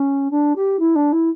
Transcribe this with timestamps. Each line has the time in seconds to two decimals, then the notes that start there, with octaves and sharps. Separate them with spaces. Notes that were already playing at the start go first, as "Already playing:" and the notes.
Already playing: C#4
0.31 D4
0.56 G4
0.79 E4
0.95 D4
1.12 E4